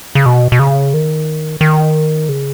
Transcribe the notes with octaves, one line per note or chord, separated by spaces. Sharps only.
C#3
B2
B2
C#3
D#3
D#3
C#3